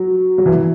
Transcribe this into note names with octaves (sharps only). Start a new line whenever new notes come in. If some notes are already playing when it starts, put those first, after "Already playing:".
Already playing: F#3
F#3
E3